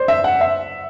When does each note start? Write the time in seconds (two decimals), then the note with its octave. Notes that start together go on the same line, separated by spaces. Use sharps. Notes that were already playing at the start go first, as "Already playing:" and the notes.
Already playing: C5 D5
0.08 E5
0.24 F#5
0.41 E5